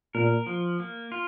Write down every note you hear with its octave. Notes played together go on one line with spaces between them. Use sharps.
A#2 A#4
F3
A#3
F4